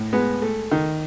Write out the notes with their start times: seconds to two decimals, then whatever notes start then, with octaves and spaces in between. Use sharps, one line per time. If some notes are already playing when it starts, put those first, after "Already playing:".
Already playing: A2
0.13 G#3 B3
0.42 A3
0.72 D#3